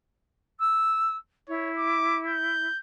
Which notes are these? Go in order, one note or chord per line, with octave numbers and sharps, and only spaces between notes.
E6
E4 C#5
D6
G6